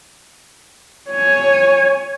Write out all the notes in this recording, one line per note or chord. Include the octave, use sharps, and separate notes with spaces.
C#5 G#5